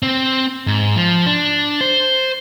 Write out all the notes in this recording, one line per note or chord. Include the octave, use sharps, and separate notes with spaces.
C4
G#2
F3
D4
C5